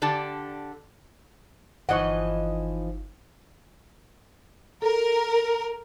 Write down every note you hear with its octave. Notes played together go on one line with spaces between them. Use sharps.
D3 D4 G4 A5
G1 E3 F3 D#4 D#5 F#5 C#6
A4 A#4